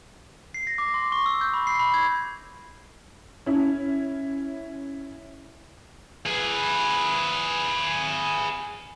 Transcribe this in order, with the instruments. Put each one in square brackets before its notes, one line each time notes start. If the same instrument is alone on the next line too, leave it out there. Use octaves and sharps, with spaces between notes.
[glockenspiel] C7
A#6
D6
C6
C#6
E6
G6
B5
C7
B5
G#6
[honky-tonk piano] C#4 E4
[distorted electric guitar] G#4 B4